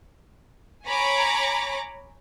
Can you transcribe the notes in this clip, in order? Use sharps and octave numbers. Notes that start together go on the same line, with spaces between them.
C#5 G#5 A#5 B5 C#6 D6